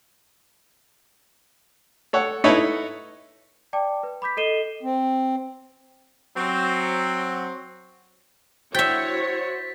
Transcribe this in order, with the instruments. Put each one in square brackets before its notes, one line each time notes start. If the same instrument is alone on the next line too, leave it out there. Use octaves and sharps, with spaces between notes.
[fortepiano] A4 C#5 F#5
D#4 E4 A4 B4 C#5
[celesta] D5 G5 A5 D6
B4
B5 D6 G6 B6
A4 D#5 C7 D#7 E7 G7
[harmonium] C4
[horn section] F#3 C4
[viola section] E4 F#4 C#5 [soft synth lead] C5 [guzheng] E5 G5 [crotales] A6 B6